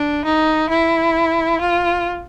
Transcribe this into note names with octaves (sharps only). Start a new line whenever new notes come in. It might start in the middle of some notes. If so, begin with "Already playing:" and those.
Already playing: D4
D#4
E4
F4